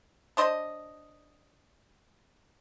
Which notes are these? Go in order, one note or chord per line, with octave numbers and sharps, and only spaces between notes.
D4 C5 D#5